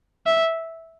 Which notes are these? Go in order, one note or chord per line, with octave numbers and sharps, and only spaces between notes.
E5